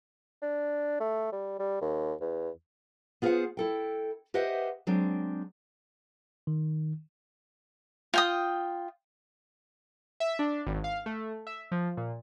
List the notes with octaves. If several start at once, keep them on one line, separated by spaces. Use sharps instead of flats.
D4
A3
G3
G3
D#2
E2
B3 F4 G#4 A#4 C5 F#5
E4 A4 G5
G4 B4 C5 D#5 E5 F#5
F#3 G#3 C4 D4
D#3
F4 G5 D#6
E5
D4
G#1
F5
A3
E5
F3
A#2